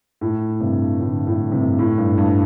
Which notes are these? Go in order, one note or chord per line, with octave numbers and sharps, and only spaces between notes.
A2
G2 C3
A2 D3
A2 D3
G2 C3
A2
G2
G2